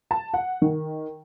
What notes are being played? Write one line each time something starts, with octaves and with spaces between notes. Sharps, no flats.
A5
F#5
D#3